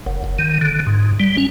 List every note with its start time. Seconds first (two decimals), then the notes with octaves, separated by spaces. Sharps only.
0.06 F#1
0.24 F#1
0.39 D#3
0.61 D3
0.87 G#2
1.20 G3
1.37 C#4